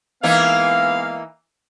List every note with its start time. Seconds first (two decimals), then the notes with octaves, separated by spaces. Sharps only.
0.23 E3 G#3 A#3 B3 D#4 F5